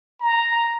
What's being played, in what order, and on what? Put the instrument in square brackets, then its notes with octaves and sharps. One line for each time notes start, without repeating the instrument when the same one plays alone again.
[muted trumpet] A#5